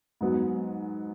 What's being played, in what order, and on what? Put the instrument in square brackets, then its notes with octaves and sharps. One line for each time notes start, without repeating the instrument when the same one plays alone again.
[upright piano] G#2 F#3 B3